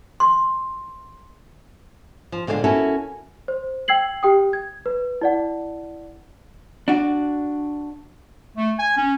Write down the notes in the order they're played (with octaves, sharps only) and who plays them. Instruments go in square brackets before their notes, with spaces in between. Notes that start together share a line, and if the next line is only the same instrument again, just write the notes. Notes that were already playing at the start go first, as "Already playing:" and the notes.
[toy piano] C6
[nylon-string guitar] F3
A#2 D3 G#3 D5 F5
C#4 E4 F#4 A4 A#4
[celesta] C5
G5 E6 G#6 C7 F#7
G4 G5 D#6
G#6
B4
E4 D5 F#5
[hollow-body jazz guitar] D4 F#4
[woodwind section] A3
G#5
C#4